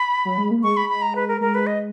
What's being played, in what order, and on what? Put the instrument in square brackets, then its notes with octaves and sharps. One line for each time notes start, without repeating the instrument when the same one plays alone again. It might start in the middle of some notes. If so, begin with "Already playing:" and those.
Already playing: [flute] B5
[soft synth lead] F#3
G#3
A#3
[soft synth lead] G#3 [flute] C#6
[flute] B5
B5
A#5
B4
A#4
[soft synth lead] G#3 [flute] A#4
[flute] B4
D#5